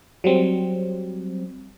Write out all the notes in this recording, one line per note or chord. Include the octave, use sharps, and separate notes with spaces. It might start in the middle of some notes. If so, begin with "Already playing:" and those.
F#3 G3 C4